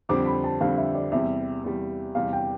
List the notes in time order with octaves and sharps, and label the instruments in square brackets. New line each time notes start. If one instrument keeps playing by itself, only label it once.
[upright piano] F2 D3 G3 C4 [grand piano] D6
[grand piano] B5
A5
[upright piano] F2 D3 G3 C4 [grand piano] F5
[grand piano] E5
D5
[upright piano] E2 C3 G3 [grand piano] E5
[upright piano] E2 C3 G3
[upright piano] E2 C3 G3 [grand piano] F5
[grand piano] G5